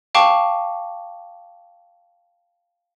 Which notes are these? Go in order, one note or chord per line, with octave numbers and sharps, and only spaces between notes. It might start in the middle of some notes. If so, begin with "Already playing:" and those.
F5 G5 A5 C#6 D6